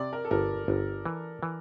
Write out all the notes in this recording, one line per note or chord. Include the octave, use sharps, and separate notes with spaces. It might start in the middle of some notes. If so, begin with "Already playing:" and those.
Already playing: C3 D5
A#4
A4
G1 A#4
G1
E3
E3